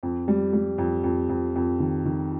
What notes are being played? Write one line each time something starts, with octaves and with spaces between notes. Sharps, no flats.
F2
G3
G3
F2
F2
F2
F2
D#3
D#3